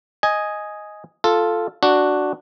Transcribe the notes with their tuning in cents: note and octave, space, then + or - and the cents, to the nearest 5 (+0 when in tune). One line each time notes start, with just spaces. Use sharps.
D#5 +5 G#5 +0
F4 +0 A4 +0
D4 +0 F#4 +0